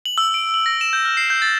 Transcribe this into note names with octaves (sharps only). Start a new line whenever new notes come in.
F#7
E6
D7
F#7
A#6
E7
G6
F6
C7
G6
A6